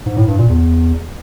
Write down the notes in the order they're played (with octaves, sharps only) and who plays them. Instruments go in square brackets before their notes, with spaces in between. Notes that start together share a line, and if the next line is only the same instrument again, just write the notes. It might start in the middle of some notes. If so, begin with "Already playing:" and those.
[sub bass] G#2
A2
G2
A#2
E2